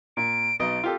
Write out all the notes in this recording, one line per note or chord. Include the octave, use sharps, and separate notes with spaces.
A#2 D7
B1 B2 D#5 D7
F4 G4 A4